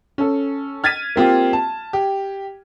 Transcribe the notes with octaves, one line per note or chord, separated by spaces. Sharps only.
C#4 A4
F6 G#6 A6 B6 D#7
A#3 C4 F4 G4
A5
G4